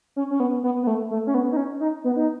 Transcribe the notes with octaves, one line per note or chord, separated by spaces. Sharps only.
C#4
C#4
B3
B3
B3
A3
A3
C#4
B3
D#4
C#4
D#4
B3
D#4